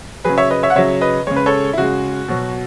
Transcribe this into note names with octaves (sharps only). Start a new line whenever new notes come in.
C#3 F#3 G#4 B4
C#5 E5
B4 D#5
C#5 E5
F#5
C#3 F#3 C#5 E5
B4 D#5
C#3 G#3 C#5
B4
A4 C#5
E4
C#3 G#3 F#4
B2 F#3